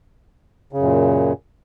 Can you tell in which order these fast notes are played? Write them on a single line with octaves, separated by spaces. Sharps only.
C#3 F#2 A#2